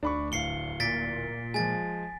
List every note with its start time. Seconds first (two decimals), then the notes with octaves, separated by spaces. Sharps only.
0.03 D2 D4 B5 C#6
0.32 D1 F5 C7 C#7 G7
0.80 A#2 A6 B6 D7
1.54 F3 G#3 G#5 A6